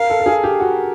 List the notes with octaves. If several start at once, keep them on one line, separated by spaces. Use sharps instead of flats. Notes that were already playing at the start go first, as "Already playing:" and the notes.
Already playing: A#4 F5
A4
A4
G#4
G4
F#4